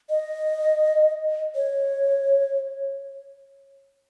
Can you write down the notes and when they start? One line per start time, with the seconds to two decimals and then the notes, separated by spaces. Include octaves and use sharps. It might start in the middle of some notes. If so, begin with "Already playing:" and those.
0.10 D#5
1.55 C#5